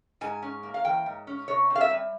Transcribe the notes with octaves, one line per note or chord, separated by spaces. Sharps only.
G#2 G#5
C#4
A#3
F5
E3 G5
G#2
C#4
C3 C#5
C4
F5
E5
G3